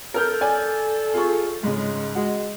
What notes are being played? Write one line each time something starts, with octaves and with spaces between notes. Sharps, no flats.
A4 A#4 F6 G6
D5 G#5
F4 G#4 C#6
G#2 C#3 G#3
G#3 F#4